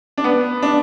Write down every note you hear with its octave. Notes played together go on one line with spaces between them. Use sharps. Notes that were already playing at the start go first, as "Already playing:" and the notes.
D4
B3
D4